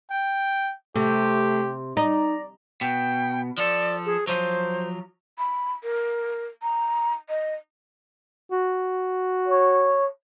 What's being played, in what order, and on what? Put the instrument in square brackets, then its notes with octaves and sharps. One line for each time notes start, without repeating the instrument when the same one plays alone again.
[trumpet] G5
[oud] C3 [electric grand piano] A3 [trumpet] G4
[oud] D#4 [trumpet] D5 [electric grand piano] A#5
[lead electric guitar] B2 [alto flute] G5
[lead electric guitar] F3 A4 [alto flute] D5
[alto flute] G#4
[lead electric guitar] F3 F#3 [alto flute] C5
[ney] B5
A#4
A#5
D#5
[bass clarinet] F#4
[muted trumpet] C#5